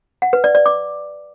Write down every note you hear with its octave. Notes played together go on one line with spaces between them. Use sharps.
F#5
B4
D5
D5
D6